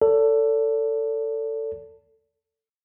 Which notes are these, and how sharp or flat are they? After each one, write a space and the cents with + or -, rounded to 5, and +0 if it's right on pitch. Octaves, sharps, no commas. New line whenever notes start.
A4 +20 D5 -45